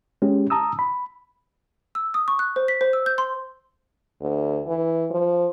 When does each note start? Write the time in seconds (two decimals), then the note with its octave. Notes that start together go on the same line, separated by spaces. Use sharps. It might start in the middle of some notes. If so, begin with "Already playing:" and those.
0.22 G#3 C#4 G4
0.50 A5 A#5 D#6 E6
0.79 B5
1.95 E6
2.14 D#6
2.28 C#6
2.39 F#6
2.56 C5
2.68 B6
2.81 C5
2.93 E6
3.06 G6
3.18 C6
4.21 D2
4.67 E3
5.10 F3